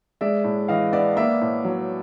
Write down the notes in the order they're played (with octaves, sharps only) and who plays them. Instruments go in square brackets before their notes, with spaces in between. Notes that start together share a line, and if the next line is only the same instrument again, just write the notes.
[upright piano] G#3 D5 E5
A2
E3 D#5 F5
B3 D5 E5
A#3 D5 E5
A2
F#3